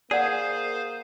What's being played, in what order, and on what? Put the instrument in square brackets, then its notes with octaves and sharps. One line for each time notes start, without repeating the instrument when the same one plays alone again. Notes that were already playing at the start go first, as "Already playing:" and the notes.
[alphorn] A#3 [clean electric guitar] G#4 [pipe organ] C5 F5 [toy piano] D5 F#5